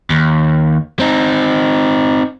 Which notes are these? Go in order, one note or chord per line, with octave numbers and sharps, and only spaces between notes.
D#2
C4 D#4